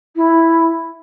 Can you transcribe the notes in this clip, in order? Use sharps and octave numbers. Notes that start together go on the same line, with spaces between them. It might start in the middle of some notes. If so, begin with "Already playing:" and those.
E4